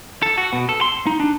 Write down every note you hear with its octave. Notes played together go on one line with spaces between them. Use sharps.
A4
F#4
B2
A4
C6
D#4
D4